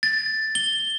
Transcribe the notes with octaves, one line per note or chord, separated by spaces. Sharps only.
A6
G7